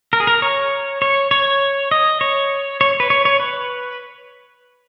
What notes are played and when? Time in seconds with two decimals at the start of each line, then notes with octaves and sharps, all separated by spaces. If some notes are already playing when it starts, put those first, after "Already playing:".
0.13 A#4
0.20 G#4
0.27 A#4
0.42 C#5
1.02 C#5
1.31 C#5
1.91 D#5
2.21 C#5
2.81 C#5
3.00 B4
3.10 C#5
3.25 C#5
3.40 B4